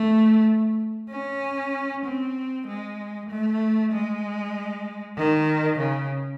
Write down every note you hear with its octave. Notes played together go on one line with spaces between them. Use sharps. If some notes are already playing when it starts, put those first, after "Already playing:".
Already playing: A3
C#4
C4
G#3
A3
G#3
D#3
C#3